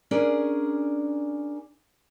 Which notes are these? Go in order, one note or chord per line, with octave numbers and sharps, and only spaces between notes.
C#4 D4 G#4 A#4